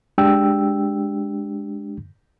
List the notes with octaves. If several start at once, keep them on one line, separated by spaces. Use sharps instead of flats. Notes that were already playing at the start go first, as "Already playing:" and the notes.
G#3 D4 G4 G5 E6